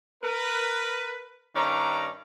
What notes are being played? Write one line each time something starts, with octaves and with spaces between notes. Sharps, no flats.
A#4 B4
G2 D#3 C#4 D5 A#5